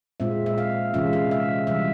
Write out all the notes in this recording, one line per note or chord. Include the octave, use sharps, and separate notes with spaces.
A#2 G#3 C4 F4 E5
E5
F5
C3 E3 G#3 C#4 F4 E5
F5
E5
C3 E3 G3 E5